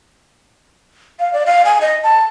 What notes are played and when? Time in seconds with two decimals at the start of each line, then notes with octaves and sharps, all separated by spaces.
1.20 F5
1.33 D5
1.46 F5
1.65 G#5
1.81 D#5
2.03 A5